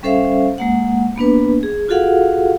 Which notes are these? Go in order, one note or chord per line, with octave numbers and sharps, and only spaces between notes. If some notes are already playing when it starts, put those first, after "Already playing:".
G3 C#4 A4 C5 E5 F5
G#3 A#3 F#5
A#3 B3 D4 B4
G#4
F4 F#4 G#4 A4 F5 F#5